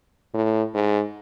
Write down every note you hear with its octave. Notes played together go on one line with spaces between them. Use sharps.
A2
G#2